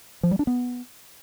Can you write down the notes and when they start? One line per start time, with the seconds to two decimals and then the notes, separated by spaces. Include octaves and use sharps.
0.23 F3
0.31 G3
0.39 D4
0.47 B3